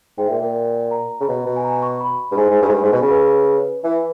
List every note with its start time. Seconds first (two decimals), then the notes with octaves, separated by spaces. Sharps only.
0.18 G#2 G5
0.27 A#2 E5
0.36 G5
0.42 A#2
0.91 A#5
1.20 C#3
1.28 B2
1.46 B2
1.56 G#5
1.64 A#5
1.82 C#6
2.01 B5
2.32 G2
2.37 G#2 G#5
2.50 G#2
2.62 G2
2.69 G#2
2.73 G2
2.83 G#2
2.92 B2
3.01 C#3
3.10 B4
3.84 E3 B4